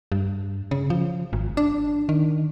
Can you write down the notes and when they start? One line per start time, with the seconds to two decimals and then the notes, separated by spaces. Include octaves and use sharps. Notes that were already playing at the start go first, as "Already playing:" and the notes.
0.12 G2
0.71 C#3
0.90 F3
1.33 G#1
1.57 D4
2.09 D#3